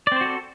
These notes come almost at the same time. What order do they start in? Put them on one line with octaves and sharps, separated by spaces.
D5 C4 C5 F#4 A4